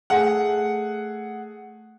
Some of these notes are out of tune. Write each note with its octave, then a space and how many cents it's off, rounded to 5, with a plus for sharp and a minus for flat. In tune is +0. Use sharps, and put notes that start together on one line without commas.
A3 +0 G#4 +0 F#5 +0